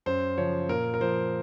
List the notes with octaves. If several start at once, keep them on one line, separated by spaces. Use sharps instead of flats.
F#2 C5
C#3 F3 C#5
A#2 A#4
A#4
F3 C5